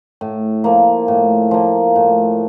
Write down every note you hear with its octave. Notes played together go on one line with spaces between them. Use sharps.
A2
F3 A#3
A2
F3 A#3
A2